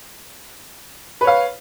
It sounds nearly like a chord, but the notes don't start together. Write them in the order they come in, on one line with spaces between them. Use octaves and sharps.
B4 C#5 F5